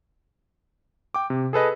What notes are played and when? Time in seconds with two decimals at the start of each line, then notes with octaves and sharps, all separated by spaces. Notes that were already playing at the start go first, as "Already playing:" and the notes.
1.14 G5 D6
1.30 C3
1.53 G#4 A4 B4 D#5